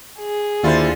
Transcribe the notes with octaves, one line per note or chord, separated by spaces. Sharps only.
G#4
D#2 D3 E4 F4 C5